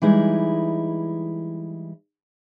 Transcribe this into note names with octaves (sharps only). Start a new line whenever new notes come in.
E3 G3 G#3 D#4 E4